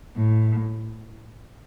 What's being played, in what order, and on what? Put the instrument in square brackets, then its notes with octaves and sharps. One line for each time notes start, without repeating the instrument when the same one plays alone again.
[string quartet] A2